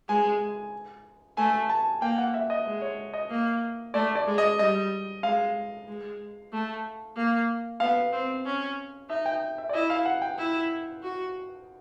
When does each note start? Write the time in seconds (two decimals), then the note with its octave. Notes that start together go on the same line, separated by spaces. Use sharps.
0.08 G#3 G#5
1.37 A3 G#5
1.69 A5
2.01 A#3 G5
2.18 F#5
2.34 E5
2.50 D#5
2.66 G#3
2.82 C#5
3.14 D#5
3.30 A#3
3.94 A3 D5
4.15 D5
4.27 G#3
4.38 D#5
4.59 G3 D#5
5.23 G#3 F5
5.88 G#3
6.52 A3
7.16 A#3
7.80 B3 F5
8.13 C4
8.46 C#4
9.09 D#4 E5
9.26 G5
9.58 E5
9.69 D5
9.73 E4 D#5
9.90 F5
10.06 F#5
10.22 G5
10.38 E4
11.03 F#4